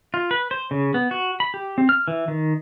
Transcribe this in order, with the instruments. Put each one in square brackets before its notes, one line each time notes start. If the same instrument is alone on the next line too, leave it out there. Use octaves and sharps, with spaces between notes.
[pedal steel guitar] F4
B4
C5
C#3
B3
F#4
B5
G4
C4
F6
E3
D#3